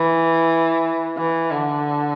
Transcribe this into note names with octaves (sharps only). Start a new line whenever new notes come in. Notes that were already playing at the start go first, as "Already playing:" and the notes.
Already playing: E3
E3
D3